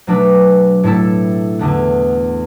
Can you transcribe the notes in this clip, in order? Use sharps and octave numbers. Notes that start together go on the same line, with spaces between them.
B2 F#3 A3 D4 B4
A2 A3 E4 A4
E2 D3 B3